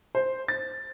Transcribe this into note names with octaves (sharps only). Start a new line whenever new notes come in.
C5
A6